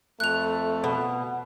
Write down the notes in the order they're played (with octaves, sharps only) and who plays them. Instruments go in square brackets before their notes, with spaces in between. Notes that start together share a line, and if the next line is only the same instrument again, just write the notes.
[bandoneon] F2 [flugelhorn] A3 [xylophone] F#6 F7
[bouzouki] B2